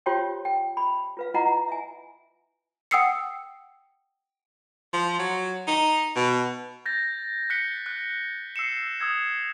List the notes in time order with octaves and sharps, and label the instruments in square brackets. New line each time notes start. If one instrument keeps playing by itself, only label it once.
[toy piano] F4 G4 C5 C#5 G5 C6
G5
B5
F4 B4 F5
E4 F4 D#5 F#5 A#5
E5 G#5
[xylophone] F#5 G5 D#6 E6 C7 C#7
[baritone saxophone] F3
F#3
D#4
B2
[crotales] G6 A6 A#6
F#6 B6 C#7 G7
F#6
E6 C7 C#7 E7
D#6 E6 G#6